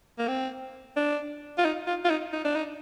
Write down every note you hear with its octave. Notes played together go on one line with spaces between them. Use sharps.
A#3
C4
D4
F4
D#4
F4
F4
D#4
D#4
D4
D#4